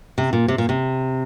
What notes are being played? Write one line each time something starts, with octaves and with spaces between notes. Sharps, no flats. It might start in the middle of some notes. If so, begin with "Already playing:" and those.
C3
A#2
C3
A#2
C3